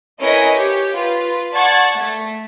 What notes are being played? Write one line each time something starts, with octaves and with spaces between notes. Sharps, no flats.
C#4 E4 A#4 B4 D#5 G#5
G4 C#5
F4 B4
D5 F#5 A5 C#6 G#6 A6
A3